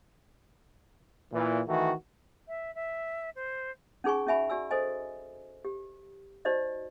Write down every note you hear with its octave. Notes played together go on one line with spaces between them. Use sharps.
A#2 E3
D#3 E3 A3 F#4
E5
E5
C5
C#4 D#4 G#4 G#5 C#6
C#4 F#4 E5 G#5 B5
F#4 D5 G#5 E6
A4 C5 D#5 G#5
G4
D#4 F#4 C5 D5 D#5